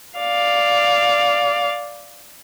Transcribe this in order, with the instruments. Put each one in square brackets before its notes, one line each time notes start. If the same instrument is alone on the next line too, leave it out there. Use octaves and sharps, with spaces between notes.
[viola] D5 F5